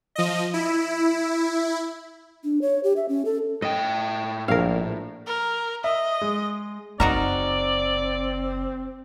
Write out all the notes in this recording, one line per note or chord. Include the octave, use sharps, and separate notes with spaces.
F3 D#5
E4
D4
C#5
G4
E5
C#4
A4
A2 D#5 G5
A#1 A#4 F5
A#4
D#5 E5
G#3
F#1 C4 D#4 F#4 A#4 D5